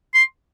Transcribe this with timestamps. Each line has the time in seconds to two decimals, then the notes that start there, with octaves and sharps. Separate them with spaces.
0.14 C6